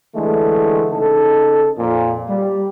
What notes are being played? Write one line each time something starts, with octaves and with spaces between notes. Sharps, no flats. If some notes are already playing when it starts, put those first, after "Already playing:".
D3 E3 G#3 A3
C#3 D#4 A4
F2 A#2
G3